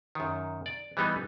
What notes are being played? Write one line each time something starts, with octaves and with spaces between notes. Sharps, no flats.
F#2 D#3
D5
E3 G3 B3 D#4